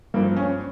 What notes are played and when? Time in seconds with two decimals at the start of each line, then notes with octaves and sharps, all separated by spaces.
0.14 G2 F3 A#3
0.36 C#4